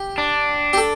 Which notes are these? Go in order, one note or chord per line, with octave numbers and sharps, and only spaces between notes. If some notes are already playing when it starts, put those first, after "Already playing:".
Already playing: G4
D4
G4
A4